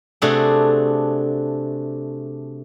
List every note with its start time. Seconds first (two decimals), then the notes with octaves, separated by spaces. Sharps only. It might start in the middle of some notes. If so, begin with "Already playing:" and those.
0.22 C3 A3 D4 F#4 G#4 A4